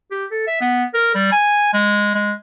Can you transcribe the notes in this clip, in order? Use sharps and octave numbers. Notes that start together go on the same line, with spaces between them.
G4
A4
E5
B3
A#4
G3
G#5
G#3
G#3